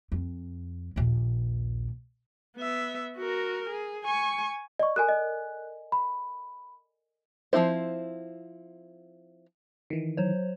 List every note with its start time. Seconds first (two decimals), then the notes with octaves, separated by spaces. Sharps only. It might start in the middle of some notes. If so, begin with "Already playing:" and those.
0.12 F2
0.96 A#1 D#2
2.57 B3 E5
3.17 F#4 A#4
3.69 G#4
4.04 G#5 C#6
4.79 D5 D#5 C#6
4.96 A4 A#4 G#5 F#6
5.08 D#5
5.92 B5
7.53 F3 A3 C4 E4 C5
9.90 D#3 E3
10.17 F#3 C5 C#5